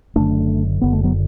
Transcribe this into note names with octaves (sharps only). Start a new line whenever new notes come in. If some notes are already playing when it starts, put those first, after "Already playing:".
F#1 F#2 D3 A3 D4
F#1 F#2 D3 B3
A3
F#3 B3